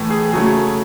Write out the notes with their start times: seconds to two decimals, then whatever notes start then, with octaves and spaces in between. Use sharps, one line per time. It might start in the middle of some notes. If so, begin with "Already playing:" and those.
Already playing: A2 E3 A3
0.10 G#4
0.32 C#3 F#3 A3 G#4